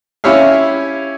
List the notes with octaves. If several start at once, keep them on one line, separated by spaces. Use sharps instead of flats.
C#4 E4 G4 C#5 E5 F5